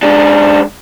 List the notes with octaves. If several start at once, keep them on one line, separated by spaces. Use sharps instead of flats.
G#2 D4